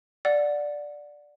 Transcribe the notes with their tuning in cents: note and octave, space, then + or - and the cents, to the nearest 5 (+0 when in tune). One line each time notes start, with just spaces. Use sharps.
D5 +0 F#5 -20